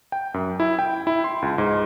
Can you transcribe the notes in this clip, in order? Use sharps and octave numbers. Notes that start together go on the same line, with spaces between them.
G5
F#2
E4
G5
E4
C6
C#2
G#2